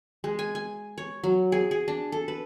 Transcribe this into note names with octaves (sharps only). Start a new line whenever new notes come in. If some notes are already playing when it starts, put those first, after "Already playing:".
G#3
G#5
G#5
C#5
F#3
G#4
G#4
D4
A4
B4